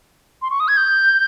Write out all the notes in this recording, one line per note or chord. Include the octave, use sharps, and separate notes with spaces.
C6
C#6
D#6
G#6
G6